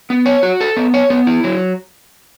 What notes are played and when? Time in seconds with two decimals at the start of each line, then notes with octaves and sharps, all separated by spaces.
0.10 B3
0.26 C#5
0.43 F#4
0.61 A4
0.77 B3
0.94 C#5
1.10 B3
1.27 E4
1.44 F#3